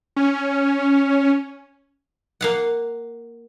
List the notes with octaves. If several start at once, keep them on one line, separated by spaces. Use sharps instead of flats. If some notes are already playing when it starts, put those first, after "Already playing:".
C#4
A#3 F5 F#5